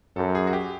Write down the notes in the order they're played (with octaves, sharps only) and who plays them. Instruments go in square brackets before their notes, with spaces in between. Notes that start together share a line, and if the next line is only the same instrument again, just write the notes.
[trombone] F#2 [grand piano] A4
[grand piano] G#4
F#4
G4